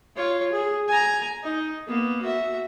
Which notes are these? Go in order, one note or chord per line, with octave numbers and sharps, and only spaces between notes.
F4 C#5
G#4
G#5 A#5
D#4
A#3 B3
F#4 E5